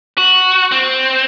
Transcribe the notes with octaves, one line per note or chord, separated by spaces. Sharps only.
F#4
C4